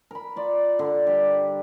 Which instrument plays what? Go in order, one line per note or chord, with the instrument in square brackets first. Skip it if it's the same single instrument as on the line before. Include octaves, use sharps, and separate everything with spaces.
[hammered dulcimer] A#4 B5
F4 D5
D3
G3 G4